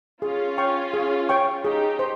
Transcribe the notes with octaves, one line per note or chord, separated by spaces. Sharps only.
C#4 F4 G#4
C#5 G5 C#6
G#4
C#5 G5 C#6
D#4 G4 G#4
C5